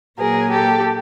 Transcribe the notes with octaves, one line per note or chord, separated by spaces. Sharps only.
A#2 F#3 G#4 A#4
G4 A4